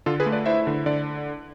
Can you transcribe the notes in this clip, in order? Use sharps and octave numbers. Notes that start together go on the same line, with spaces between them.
D3 F4 A4
G#4 B4
A3
B4 D5
E4 C5 E5
D3
D3 D5